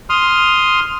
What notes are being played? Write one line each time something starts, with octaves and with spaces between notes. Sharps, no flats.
C6 D#6 F6